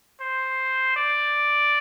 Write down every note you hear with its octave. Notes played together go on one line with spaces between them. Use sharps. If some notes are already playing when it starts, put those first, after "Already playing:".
C5
D5